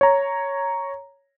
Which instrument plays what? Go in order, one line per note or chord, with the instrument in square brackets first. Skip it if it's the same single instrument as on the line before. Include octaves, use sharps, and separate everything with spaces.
[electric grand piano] C#5 A#5